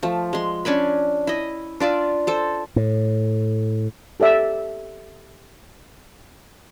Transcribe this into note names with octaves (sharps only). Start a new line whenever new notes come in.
F3 A3
G#3 C6
C#4 D4 G#5 B5
E4 D#5
D4 F4 D5 E5
A4 C5
A2
G4 A4 D5 E5